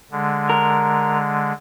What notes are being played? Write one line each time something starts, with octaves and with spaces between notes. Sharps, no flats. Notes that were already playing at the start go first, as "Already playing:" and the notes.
D3 G#3
A#4